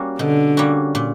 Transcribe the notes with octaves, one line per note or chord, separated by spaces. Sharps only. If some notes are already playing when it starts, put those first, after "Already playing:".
Already playing: G3 A#3 C#4 F#4
B2 D3
G3 A#3 C#4 F#4
A#2